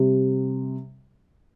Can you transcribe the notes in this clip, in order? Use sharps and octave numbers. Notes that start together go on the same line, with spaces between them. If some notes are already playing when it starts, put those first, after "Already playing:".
Already playing: C3 G3